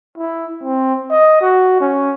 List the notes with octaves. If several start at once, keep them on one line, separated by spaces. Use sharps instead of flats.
E4
C4
D#5
F#4
C#4